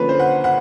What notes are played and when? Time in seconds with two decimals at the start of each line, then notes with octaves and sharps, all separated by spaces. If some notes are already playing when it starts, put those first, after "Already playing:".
Already playing: D3 F3 A#3 C#4 B4
0.09 C5
0.20 F#5
0.44 F#5